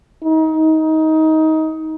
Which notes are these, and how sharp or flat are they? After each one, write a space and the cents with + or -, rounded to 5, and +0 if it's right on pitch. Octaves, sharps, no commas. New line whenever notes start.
D#4 +20